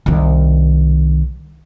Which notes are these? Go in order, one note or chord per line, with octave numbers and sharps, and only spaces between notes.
C2 D#3